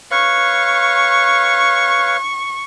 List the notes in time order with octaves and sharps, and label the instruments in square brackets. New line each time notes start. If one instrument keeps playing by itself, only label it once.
[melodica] B4 C#5 F5 [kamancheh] C#6